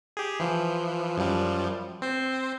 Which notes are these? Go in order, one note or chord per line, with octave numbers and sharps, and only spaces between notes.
G4 G#4
E3 F3
F#2 F3 G3
C4 C5